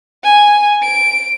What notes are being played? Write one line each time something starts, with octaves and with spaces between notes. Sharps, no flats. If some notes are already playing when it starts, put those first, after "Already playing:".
G#5
D7